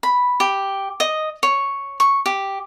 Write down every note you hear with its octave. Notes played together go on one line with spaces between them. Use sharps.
B5
G4
D#5
C#5
C#6
G4